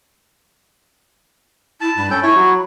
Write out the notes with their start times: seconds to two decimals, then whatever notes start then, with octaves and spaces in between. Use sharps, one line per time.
1.81 E4 A5
1.97 G2 B5
2.11 C#4 A4 G5
2.23 E4 C#5
2.36 F#3